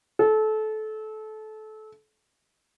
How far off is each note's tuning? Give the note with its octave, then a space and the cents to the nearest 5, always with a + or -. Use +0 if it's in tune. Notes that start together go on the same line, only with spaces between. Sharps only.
A4 -25